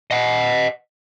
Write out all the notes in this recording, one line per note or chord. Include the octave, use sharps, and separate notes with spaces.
D#5 F#5